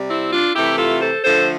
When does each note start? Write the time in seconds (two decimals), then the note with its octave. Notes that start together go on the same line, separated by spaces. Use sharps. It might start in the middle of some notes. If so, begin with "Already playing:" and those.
Already playing: C3 G3
0.10 C4 E4
0.32 D4 F4
0.55 C3 E3 A3 E4 G4
0.78 F4 A4
1.02 A4 C5
1.24 D3 F3 A3 A4 C5